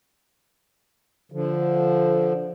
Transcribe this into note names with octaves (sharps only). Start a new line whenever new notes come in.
D3 F3